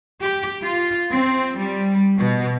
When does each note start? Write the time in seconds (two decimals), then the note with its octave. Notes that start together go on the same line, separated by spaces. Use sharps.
0.21 G4
0.63 F4
1.10 C4
1.58 G3
2.18 B2